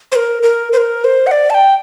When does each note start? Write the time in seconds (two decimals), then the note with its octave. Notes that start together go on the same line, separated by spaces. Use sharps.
0.12 C5
0.16 A#4
0.43 A#4
0.73 C5
0.77 A#4
1.04 C5
1.27 F#5
1.31 D5
1.50 A5
1.54 G5